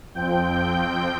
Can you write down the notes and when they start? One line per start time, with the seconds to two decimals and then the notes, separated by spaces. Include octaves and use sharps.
0.14 F2 F3 C4 G5 G6